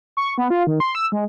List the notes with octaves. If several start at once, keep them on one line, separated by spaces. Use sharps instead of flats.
C#6
B3
F4
D#3
C6
E6
G#3